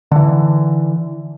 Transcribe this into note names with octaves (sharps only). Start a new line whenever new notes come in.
D3 E3